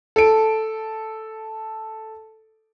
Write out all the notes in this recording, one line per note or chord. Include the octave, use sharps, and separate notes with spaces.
A4 D7